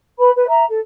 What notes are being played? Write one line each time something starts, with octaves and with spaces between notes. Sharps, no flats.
B4 B5
B4
E5 A#5
A4